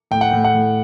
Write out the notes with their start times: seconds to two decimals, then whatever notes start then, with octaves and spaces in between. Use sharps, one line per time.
0.11 A2 G5
0.21 F#5
0.30 A2 G5
0.44 F#5
0.55 A2